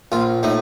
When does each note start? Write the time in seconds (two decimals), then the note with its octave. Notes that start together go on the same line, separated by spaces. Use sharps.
0.12 A#1 F4
0.43 A2 D#4